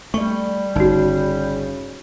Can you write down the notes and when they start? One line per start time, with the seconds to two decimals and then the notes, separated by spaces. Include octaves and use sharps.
0.14 G3 A3 D5 C#6
0.76 G1 C#3 D#4 F#4